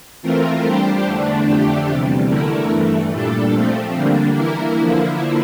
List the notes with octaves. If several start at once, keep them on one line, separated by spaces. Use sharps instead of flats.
E3 A3 C4 F4 A#4
G3 D4 G4 C5
E2 D3 A3 D4
F2 D3 A3 D4 G4
E2 C3 G3
E2 D3 A3 E4 A#4
G2 E3 A3
A#2 G3 D4 A4
F3 A3 C4
D3 G3 A#3 D4
E3 A#3 E4 A#4
D3 F3 A#3 E4